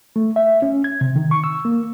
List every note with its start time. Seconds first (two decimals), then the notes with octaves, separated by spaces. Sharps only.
0.16 A3
0.36 E5
0.62 C#4
0.84 G#6
1.01 C3
1.16 D#3
1.31 C#6
1.44 E6
1.65 A#3